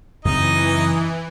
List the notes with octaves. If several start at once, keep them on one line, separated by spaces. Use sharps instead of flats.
F#2 C#3 E3 C4 D#4 D#5